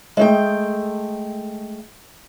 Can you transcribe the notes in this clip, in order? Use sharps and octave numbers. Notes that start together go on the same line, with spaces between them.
G#3 A3 G5